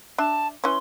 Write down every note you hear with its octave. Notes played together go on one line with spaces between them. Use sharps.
D4 E5 A5
E3 C#4 C6